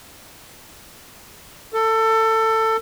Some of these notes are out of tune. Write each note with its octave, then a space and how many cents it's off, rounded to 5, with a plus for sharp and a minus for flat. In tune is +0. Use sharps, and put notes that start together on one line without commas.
A4 +20